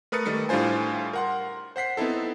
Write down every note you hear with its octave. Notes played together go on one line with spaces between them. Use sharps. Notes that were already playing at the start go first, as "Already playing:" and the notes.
A3 A#4 B4 D#6 A6 C#7
D#3 G3 A3 C#7
A2 G3 D4 F4 C5 G#5
A#4 F#5 C6
C5 F#5 B6 C7
B3 C4 D#4 E4 A4